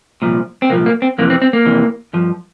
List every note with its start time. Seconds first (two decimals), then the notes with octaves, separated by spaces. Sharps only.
0.22 C2 A#2 F3
0.62 C4
0.69 C2 A#2 F3 A#3
0.86 A#3
1.02 C4
1.18 F2 C3 E3 A#3
1.30 C4
1.42 C4
1.53 A#3
1.65 F2 C3 E3
2.13 G2 F3